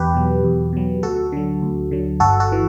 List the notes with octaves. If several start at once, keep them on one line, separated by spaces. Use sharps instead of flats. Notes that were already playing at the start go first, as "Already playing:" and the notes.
Already playing: E2 G4 B4
B2 F#3
E2
B2 F#3
D2 F#4 A4
D3 F#3
D2
D3 F#3
G1 F#4 A4
F#4 A4
E3